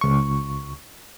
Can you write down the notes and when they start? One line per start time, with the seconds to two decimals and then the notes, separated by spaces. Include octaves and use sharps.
0.01 C#2 C#6